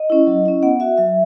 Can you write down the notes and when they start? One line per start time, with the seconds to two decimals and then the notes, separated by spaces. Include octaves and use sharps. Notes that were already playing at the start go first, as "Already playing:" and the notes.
Already playing: D#5
0.10 C#4 E4
0.27 F#3
0.46 C#4 E4
0.63 B3 F#5
0.80 F#4 E5
0.98 F#3 E5